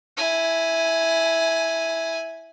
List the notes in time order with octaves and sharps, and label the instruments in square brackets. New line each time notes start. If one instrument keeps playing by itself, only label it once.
[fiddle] E4 G#5